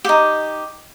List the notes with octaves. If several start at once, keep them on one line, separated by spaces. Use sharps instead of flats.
D#4 G4